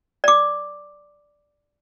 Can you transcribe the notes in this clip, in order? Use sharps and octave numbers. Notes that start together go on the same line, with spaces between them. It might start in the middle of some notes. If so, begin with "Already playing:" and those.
D5 D6